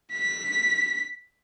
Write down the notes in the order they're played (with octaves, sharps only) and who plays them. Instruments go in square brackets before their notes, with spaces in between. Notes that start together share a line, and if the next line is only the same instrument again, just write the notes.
[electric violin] B6